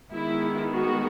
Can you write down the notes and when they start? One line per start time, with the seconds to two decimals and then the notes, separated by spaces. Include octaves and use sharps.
0.12 D#3 G#3 B3 E4
0.74 F#4